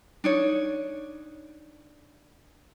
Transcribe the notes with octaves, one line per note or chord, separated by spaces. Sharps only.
D4 D#4 C#5